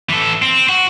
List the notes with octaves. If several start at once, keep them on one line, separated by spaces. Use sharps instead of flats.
E3 A4
C4
F#4